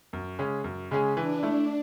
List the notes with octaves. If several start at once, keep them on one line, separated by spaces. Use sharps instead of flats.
F#2
C#3 G#3 C#4 G#4
F#2
C#3 G#3 C#4 G#4
E3 D4
A3 E4